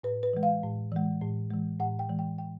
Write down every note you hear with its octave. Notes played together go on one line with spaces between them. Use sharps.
A2 B4
B4
E3 G#3
F5
A2
E3 G#3
A2
E3 G#3
A2 F#5
G5
E3 G#3
G5
G5